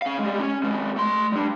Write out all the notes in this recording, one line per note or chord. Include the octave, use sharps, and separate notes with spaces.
C#4 F5
G3 G#3
C#4
D#2 G#3
A3 C6
G3 D4